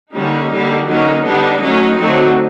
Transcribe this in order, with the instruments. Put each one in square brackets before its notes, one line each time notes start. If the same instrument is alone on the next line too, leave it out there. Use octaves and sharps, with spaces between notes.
[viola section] D3 G3 A#3 C#4 D#4
D3 G3 A#3
D3 F#3 A#3 C#4 D#4
D3 G3 B3 D4 D#4
F#3 A3 C#4
D3 F#3 A3 C4